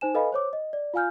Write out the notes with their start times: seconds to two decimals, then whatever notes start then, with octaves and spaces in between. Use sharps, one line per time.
0.01 D#4 C5 G#5 E7
0.14 A4 B4 D#5 F5 G#5 B5
0.32 C5 C#5 D6
0.53 D#5
0.73 D5
0.94 F4 F5 G#5 F6 G6